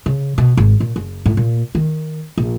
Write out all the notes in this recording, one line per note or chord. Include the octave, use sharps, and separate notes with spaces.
C#3
B2
G#1
A#2
F#1
A2
A#2
D#3
A#1